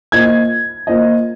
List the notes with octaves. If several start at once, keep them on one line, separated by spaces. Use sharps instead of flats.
A#3 F4 C5 D#5 G#6
A#3 F4 C5 D#5